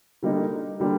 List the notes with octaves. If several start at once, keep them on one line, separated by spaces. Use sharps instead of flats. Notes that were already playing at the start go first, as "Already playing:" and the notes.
D3 G3 A#3 D#4
D3 G3 A#3